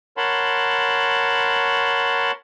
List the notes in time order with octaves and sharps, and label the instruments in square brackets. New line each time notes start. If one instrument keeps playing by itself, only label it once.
[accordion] A#4 C#5 F#5 A5 B5 C6